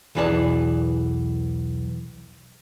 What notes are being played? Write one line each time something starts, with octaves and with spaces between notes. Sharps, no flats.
B1 E2 E3 G#4 D5 A5